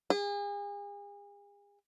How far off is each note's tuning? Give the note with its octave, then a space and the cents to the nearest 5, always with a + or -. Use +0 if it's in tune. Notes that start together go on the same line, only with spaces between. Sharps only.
G#4 -40